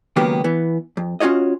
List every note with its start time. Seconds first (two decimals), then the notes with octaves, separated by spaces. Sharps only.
0.16 C#2 D#3 F#3 A#3 B3 G4
0.44 E3 B3
0.97 F2
1.20 C#4 F4 F#4 C#5 D#5